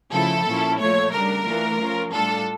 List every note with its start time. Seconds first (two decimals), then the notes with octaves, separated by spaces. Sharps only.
0.13 C#3 F3 A3 E4 A4
0.46 A#2 F3 C#4 E4
0.79 A#2 F3 A3 C#5
1.13 C#3 G3 D4 A#4
1.46 E3 A3 D4 F4
1.80 F3 C#4 F4
2.12 A2 G3 D4 F4 A4